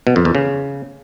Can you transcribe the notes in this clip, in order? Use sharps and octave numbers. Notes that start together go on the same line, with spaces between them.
B2
F2
E2
C#3